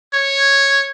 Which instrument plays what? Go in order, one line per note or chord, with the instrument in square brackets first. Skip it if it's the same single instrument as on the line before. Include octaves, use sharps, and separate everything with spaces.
[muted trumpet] C#5